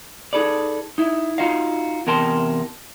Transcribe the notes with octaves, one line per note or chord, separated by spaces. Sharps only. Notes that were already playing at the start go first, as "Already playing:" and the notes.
D#4 G#4 A4 B4 D5
D#4 E4
D#4 F4 F#4 D#5 F5
E2 C3 A#4 G5 A5 C6